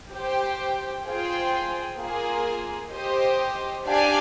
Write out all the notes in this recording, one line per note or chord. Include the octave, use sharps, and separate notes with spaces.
G4 C5 G5
F4 G#4 C5 G5
A#3 F4 G#4
G4 C5 D#5
D4 G4 D5 F5 G#5